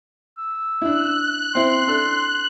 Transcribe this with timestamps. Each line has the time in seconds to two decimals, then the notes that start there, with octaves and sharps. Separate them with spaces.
0.38 E6
0.82 D4 E4 F#6
1.55 C4 E4 C6
1.87 D4 A4